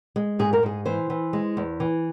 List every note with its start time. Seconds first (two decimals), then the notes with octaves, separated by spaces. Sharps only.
0.16 G#3
0.39 G#2 G#4
0.53 A#4
0.63 G#2 G#4
0.86 E3 C5
1.10 E3
1.33 G#3
1.57 E2
1.80 E3